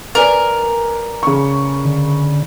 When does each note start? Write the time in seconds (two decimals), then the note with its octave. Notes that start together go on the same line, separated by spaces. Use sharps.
0.15 A#4 B4 D5 G#5
1.23 C#3 C#6
1.85 D3